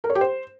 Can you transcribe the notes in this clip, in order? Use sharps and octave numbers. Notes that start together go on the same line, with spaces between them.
A#4
C#5
G4
C5